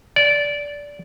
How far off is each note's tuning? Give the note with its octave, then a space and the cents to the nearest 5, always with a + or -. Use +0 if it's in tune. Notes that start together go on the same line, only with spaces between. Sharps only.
D5 -15